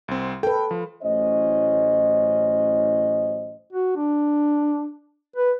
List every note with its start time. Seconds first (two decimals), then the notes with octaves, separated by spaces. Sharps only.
0.08 C2 C4
0.43 A4 B4 G5
0.71 F3
1.03 A1 A2 F#3 C#4 C5 D#5
3.73 F#4
3.96 D4
5.36 B4